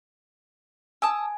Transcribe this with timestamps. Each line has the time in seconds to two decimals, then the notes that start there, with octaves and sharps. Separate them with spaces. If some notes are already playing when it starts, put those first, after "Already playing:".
1.02 G#5 A5 D#6 E6